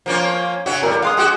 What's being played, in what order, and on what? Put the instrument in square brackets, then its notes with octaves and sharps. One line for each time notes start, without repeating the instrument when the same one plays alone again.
[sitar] F3 A#3 C#4
[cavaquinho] C#5
[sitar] C#3 C#4 F#4 [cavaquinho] E5
[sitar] A2 G3 [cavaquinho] A#4
[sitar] G#3 [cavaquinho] F5 C6 D#6
[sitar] G#3 F#4 G4